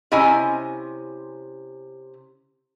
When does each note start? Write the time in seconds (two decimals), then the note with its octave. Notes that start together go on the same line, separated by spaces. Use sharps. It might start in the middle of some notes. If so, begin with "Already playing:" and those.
0.12 C3 C#4 E4 D#5 G#5